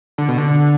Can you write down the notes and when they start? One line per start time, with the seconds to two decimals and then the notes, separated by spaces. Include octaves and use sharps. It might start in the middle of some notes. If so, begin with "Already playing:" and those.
0.18 D3
0.28 B2
0.38 D3